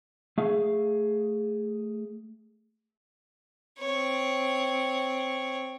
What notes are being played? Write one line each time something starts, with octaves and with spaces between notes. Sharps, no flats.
A3 G#4 F5
C4 C#5